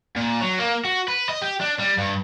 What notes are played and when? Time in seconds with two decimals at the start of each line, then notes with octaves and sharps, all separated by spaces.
0.16 A#2
0.41 F#3
0.59 A#3
0.85 F#4
1.08 B4
1.29 D#5
1.42 G4
1.61 D4
1.79 G3
1.98 G2